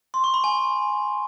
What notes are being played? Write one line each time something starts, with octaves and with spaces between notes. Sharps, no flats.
C6
C#6
B5
G#5